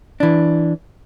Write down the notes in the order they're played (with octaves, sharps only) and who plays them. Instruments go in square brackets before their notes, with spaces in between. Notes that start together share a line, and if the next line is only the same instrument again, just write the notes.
[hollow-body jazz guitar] E3 D4